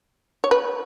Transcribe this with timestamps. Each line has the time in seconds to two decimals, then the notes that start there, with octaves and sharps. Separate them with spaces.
0.44 C#5
0.51 B4